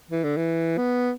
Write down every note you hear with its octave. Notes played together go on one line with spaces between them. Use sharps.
E3
D3
E3
B3